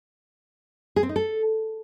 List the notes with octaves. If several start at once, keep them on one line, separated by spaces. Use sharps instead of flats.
G#4
C4
D#4
A4